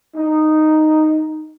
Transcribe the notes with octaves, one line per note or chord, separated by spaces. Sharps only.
D#4